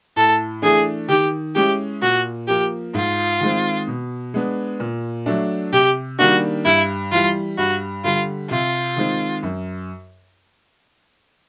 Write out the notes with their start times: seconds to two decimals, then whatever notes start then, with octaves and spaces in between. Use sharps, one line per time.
0.16 A2 A4
0.62 E3 A3 D4 G#4
1.08 D#3 G4
1.55 G#3 C#4 E4 G4
2.02 A#2 F#4
2.47 F3 A#3 G4
2.94 G#2 F4
3.40 D#3 G#3 C4
3.88 B2
4.34 G#3 B3 D4
4.80 A#2
5.26 F#3 A3 D4
5.72 C3 G4
6.19 D#3 G3 A#3 D4 F#4
6.65 G2 E4
7.12 E3 G3 F4
7.58 G2 F#4
8.04 D3 G3 F4
8.50 C3 F4
8.96 D#3 G#3 C4 D#4
9.43 F#2